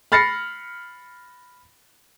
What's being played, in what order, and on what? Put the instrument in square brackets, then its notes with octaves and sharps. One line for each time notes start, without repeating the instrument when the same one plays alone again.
[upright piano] B5 F6 A6 A#6 C7 C#7